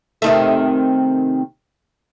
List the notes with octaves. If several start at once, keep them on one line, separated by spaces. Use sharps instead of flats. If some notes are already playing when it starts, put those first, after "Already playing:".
C3 D#3 A3